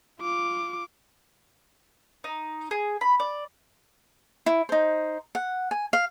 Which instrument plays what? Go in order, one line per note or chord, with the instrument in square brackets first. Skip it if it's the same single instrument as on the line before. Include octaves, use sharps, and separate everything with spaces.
[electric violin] F4 D6
[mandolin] D#4
G#4
B5
D5
[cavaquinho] E4
D#4 C5
F#5
G#5
F5